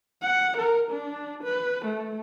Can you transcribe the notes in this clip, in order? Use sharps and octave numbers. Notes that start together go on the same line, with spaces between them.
F#5
A#4
D4
B4
A3